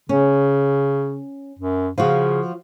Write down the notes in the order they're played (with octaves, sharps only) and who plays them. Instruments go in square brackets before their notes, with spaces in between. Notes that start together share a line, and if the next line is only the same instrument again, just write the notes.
[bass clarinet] C#3 [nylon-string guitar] C#4
[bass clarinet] F#2
[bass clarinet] C#3 [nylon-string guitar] F3 F4 F#4